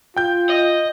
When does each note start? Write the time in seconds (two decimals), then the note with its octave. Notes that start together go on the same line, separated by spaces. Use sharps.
0.17 F4 G5 G6
0.50 D#5